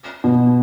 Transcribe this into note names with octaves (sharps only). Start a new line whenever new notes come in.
B2